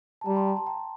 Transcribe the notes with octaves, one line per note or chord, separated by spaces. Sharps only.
A5
G3 G5 A#5
A5 C6
G5 A#5
A5 C6
G5 A#5